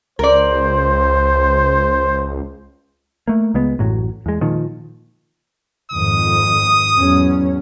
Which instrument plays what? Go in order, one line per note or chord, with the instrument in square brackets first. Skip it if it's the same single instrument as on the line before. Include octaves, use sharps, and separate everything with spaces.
[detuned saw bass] C#2 [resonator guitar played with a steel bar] A#4 D5 [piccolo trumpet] C5
[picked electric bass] A3 A#3
C#2 G#3 B3
A1 F#2 A2 F#3
E2 G#3
A#2 D#3 F3
[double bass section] G#1 F2 [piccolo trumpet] D#6
[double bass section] E2 F#3 C#4